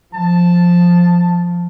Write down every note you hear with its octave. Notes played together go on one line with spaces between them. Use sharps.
F3 A5